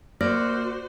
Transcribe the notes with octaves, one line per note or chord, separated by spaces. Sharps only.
A#3 F#4 C5 D5 F6 A#6